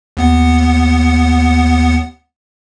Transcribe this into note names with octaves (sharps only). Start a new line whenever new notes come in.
D#2 B3 F#5